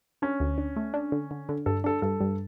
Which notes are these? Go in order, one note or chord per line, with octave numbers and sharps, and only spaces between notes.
C#4 D4
D2
D4
A3
D4
D3
D3
D3
G2 A4
D4 A4
G2 A4
G2